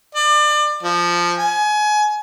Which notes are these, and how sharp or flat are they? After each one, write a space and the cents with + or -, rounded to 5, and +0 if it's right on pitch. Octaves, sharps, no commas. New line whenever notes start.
D5 +30
F3 -5
G#5 +25